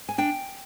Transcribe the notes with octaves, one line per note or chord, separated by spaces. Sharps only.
G#5
D4 G5